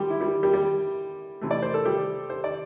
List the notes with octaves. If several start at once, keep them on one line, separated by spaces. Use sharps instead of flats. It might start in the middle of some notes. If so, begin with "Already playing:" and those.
Already playing: D3 G3 G4
E4
G3 G4
G3 G4
G3 G4
C3 E3 A3
D5
C5
A4
G3 G4
C5
D5